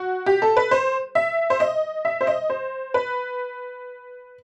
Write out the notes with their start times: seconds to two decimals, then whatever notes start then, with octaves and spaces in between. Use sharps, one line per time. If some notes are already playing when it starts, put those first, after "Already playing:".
Already playing: F#4
0.26 G4
0.42 A4
0.57 B4
0.71 C5
1.15 E5
1.50 C5
1.60 D#5
2.05 E5
2.21 C5
2.27 D#5
2.50 C5
2.94 B4